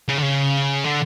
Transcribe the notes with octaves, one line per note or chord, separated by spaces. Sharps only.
C#3
D3
C#3
D3